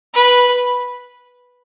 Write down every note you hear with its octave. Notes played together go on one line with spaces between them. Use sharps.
B4